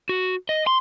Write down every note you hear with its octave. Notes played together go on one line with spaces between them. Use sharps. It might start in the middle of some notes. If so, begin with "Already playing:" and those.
F#4
D#5
C6